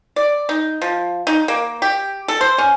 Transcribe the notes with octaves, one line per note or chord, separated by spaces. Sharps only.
D5
D#4
F3
D#4
A#3
G4
A4
C5
C#4